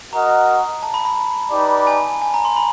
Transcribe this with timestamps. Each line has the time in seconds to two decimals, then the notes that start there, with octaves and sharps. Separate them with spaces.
0.12 F#4 A#4 D#5 F#5 A#5
0.83 A5
0.94 B5
1.05 B5
1.52 D#4 G4 B4 D5
1.87 G#5
2.22 G#5
2.34 A#5
2.45 C6
2.56 B5